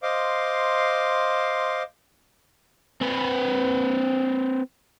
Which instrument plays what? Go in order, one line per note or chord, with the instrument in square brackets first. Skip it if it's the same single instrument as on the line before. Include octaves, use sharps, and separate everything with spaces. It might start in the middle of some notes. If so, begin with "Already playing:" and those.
[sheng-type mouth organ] C5 D#5 F5 C6 D6
[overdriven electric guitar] C4 B4